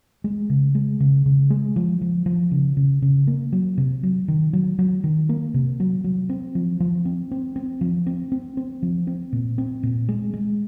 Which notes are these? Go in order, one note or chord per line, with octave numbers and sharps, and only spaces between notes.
G#3
C#3
G#3
C#3
C#3
G#3
F3
F3
F3
C#3
C#3
C#3
A#3
F#3
C3
F#3
D#3
F#3
F#3
D#3
A#3
C3
F#3
F#3
C4
F3
F3
C4
C4
C4
F3
C4
C4
C4
F3
C4
A#2
C4
A#2
G#3
G#3